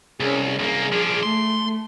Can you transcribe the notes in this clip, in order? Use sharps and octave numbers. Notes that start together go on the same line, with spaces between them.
C2 C#4 G#4
C2 A#3 G#4
F3 D4
A3 C6